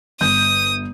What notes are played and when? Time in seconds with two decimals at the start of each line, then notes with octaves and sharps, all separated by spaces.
0.21 G1 D#6 G6